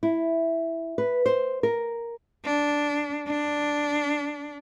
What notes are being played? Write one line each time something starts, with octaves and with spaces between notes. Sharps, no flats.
E4
B4
C5
A#4
D4
D4